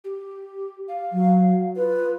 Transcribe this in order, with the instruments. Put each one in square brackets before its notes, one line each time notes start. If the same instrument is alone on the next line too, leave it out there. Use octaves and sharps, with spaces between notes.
[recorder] G4
F5
[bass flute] F#3
[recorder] F4 [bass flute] B4